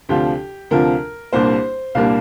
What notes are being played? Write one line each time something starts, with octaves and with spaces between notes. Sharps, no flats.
D2 C3 F3 D4 F4 G4
D2 C3 F3 D4 F4 A#4
C2 A#2 G3 A#3 D4 C5
C2 A#2 G3 A#3 D4 F5